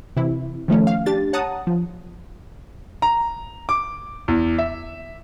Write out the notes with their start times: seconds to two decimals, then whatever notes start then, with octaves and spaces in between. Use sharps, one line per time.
0.17 C3 E3 E4
0.68 D#3 F3 A3 C#4
0.87 F5
1.06 D4 G4 A6
1.33 C#5 F#5 A5 A#5 D#6
1.67 F3
3.02 A#5
3.69 D6
4.28 E2
4.58 E5